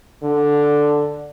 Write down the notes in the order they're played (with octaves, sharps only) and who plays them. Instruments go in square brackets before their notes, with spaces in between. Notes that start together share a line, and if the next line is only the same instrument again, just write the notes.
[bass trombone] D3